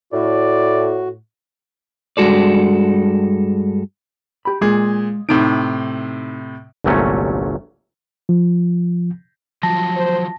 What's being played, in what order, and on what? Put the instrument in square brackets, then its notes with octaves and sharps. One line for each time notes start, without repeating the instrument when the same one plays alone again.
[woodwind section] A2 [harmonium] F#4 [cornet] D5
[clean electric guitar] G2 G#3 F#4 A4 D5
[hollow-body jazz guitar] G4 B5
[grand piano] A#2 G#4 [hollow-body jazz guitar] G#3
[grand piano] A2 C3 D7 [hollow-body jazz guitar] D#4
[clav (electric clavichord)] G1 C2 A#2 F#3 A3 C#4
[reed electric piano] F3
[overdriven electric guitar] F3 F#3 [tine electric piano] A5 A#6
[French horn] C5